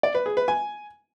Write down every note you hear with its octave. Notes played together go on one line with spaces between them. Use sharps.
D5
B4
G#4
B4
G#5